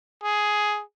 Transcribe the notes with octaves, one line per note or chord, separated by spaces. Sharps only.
G#4